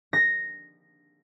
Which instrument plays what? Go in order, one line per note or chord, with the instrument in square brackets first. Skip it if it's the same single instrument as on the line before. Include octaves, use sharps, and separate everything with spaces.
[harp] A#6